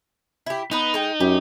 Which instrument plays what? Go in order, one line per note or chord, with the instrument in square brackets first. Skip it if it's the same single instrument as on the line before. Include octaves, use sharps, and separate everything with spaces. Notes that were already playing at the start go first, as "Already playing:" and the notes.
[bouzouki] E4 G4
[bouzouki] B3 B4 [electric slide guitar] D#4
[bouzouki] G#3 G5
[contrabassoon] F#2 [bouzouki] G4